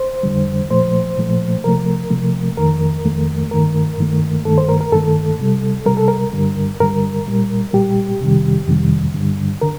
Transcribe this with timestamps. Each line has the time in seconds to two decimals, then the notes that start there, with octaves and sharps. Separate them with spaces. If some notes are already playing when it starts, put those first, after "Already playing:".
Already playing: C5
0.23 F2 D3 G3
0.70 A#2 F3 A3 C5
1.17 A#2 F3 A3
1.64 C3 F3 A3 A#4
2.10 C3 F3 A3
2.58 F2 D#3 A3 A#4
3.05 F2 D#3 A3
3.51 G2 D#3 A3 A#4
3.99 G2 D#3 A3
4.45 G2 D#3 A3 A4
4.58 C5
4.69 A#4
4.81 A#4
4.92 G2 D#3 A3 A4
5.39 C3 G3
5.86 C3 G3 A#4
5.97 A4
6.08 A#4
6.33 G2 D3 G3
6.80 G2 D3 G3 A#4
7.27 A#2 G3
7.73 A#2 G3 G4
8.20 F2 C3 D#3 G3
8.67 F2 C3 D#3 G3
9.14 G2 D3 G3
9.61 D3 A#4